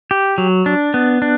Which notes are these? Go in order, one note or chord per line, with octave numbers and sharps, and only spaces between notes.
G4
F#3
D4
B3
D4